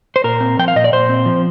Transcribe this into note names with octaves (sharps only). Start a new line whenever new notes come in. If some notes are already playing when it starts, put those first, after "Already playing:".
C5
A#2 A#4
C4
F3 G5
F5
A#2 D#5
D5
A#2 C5
C4
F3